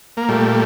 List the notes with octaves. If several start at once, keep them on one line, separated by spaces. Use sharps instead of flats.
A#3
A#2 G3 A3